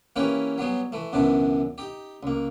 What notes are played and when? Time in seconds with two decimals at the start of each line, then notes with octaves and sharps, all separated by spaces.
0.16 E3 A#3 C#4 E4 G4 B4
0.58 F#3 G3 B3 G#4
0.92 E3 A3
1.13 C#2 F#2 B2 E3 D4 D6
1.78 D#4 G4
2.23 C#2 A#3